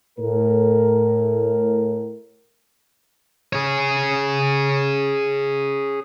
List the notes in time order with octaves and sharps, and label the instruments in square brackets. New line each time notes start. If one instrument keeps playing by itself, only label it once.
[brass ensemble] A2 A#4
[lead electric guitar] G#4 C#5